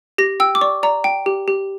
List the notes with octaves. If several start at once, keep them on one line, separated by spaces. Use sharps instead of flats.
G4 A#6
G5 E6
D6
D5 C#6
D5 A#5
G5
G4
G4